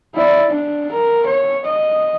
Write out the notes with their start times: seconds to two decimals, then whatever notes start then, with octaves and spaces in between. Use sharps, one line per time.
0.15 E4 D5
0.50 D4
0.92 A#4
1.26 C#5
1.65 D#5